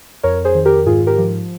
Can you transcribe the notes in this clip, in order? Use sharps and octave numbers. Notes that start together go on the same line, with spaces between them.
F2 A#4 C#5
G#4 C5
D#3
G4 A#4
G#2 F4 G#4
G4 A#4
F3